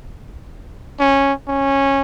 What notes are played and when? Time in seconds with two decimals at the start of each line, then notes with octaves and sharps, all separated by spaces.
1.00 C#4
1.48 C#4